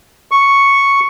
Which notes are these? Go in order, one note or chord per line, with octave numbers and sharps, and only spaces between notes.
C#6